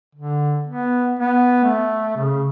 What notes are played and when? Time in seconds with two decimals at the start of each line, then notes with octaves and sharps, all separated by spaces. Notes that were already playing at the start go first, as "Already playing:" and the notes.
0.15 D3
0.67 B3
1.19 B3
1.64 A3
2.16 C#3